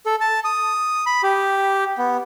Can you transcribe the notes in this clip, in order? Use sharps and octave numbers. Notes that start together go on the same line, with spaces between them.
A4
A5
D#6
B5
G4
B3